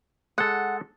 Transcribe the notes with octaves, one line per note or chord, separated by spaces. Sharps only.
G#3 A4 F#5